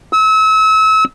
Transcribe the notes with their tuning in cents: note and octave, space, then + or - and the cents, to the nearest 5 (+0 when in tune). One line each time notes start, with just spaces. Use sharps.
E6 -35